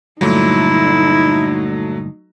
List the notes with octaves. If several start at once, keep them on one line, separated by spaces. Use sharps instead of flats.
D2 G2 A#2 F#3 A3 D#4 E4